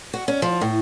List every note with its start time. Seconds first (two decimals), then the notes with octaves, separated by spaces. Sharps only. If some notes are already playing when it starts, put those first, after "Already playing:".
0.13 F#4
0.28 C#4
0.42 F3
0.61 A2